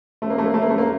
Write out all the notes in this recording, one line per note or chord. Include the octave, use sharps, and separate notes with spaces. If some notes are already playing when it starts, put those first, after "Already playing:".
A3
A#3
A3
A#3
A3
A#3
A3
A#3